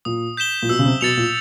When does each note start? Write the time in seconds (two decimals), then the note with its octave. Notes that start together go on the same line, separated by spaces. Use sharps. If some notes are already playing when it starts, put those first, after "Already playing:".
0.05 A#2 D#6
0.37 G6 B6 E7 G7
0.62 A#2
0.69 B2 E6
0.79 C#3
0.86 C3
1.01 B2 A6 C#7 F7
1.17 A#2